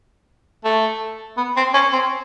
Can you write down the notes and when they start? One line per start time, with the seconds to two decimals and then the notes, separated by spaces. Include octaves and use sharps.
0.65 A3
1.37 B3
1.57 C4
1.74 C#4
1.93 C4